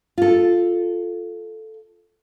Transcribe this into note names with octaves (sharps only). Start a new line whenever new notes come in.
F4 A4